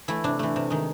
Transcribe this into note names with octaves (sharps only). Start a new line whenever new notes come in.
E3 A3 E4
C3 D4
E3 A3
C3
D#3 G#3